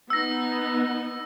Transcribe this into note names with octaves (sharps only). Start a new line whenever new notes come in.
B3 D#4 E6 A#6